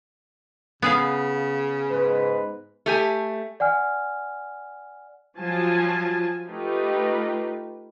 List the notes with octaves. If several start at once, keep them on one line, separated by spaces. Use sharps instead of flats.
C#3 B3 G#4 F5
G#2 B4
A3 G4 G#5
D5 F#5 G#5 F6
F3 F#3 F4 G#5 A5
A3 D#4 F4 G4 B4